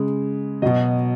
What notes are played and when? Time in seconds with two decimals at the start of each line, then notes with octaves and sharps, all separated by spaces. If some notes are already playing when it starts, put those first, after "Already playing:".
Already playing: C#3 G#3
0.62 B2 F#3 D#5